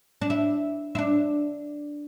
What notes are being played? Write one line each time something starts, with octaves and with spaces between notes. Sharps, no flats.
D4
E4
E4
D4